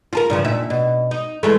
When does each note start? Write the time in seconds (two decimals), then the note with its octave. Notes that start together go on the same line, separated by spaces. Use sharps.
0.13 F4 A4 A#4
0.30 G2 C#3 F3
0.44 D#2 A#2 E5
0.70 B2
1.11 D#4
1.43 E3 G#3 A3